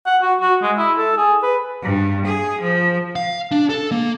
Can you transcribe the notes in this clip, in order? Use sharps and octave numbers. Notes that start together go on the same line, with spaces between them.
F#5
F#4
F#4
G#3
E4
A4
G#4
B4
G2
G#4
F3
F5
D4
A4
A#3